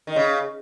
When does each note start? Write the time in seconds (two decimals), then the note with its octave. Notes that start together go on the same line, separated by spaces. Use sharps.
0.07 D#3
0.16 C#3